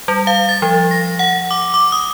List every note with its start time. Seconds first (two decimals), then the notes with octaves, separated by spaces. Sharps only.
0.08 G3
0.27 F5
0.49 A6
0.62 F3
0.91 A#6
1.19 F#5
1.51 D6
1.74 D6
1.92 D#6